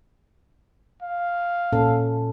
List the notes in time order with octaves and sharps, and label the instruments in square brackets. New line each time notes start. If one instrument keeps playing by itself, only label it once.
[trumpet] F5
[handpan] A#2 C#4 A4